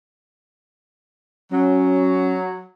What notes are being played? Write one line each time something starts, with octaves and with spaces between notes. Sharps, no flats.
F#3 C#4